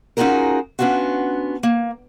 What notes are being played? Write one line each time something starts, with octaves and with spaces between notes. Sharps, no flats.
C#4 D#4 F4 F#4 G#4 A#4
B3 C#4 D4 F4 F#4
A#3